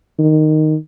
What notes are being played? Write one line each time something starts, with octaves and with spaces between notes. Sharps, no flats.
D#3